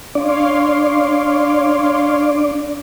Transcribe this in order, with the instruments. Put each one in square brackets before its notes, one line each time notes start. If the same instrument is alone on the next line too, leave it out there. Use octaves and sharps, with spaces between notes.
[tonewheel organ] D4 D5 [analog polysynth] C#5 F5 C6